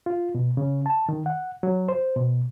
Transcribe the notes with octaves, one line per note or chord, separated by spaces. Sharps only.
F4
B2
C#3
A5
D#3
F#5
F#3
C5
B2